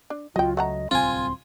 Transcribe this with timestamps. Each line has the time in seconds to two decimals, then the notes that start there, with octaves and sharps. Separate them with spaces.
0.10 D4
0.36 C#2 F#3 F4 D#5 G5
0.57 A3 D#5 F#5 A#5
0.91 D1 C2 C4 F4 G#5 C6
1.15 C6